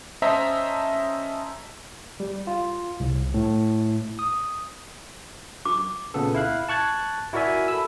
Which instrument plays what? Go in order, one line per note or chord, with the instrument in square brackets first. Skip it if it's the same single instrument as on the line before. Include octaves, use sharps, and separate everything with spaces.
[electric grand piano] C#4 C5 D#5 E5 A5 A#5
[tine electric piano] G3
F4
C2
A2
D#6
[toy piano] D6
[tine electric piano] A#2 C#3 B3 A4
E4 F5 F#6
A5 C#6 F#6 G#6 A6
E4 F#4 A#4 D5 E5 G#5
A4 B5 E6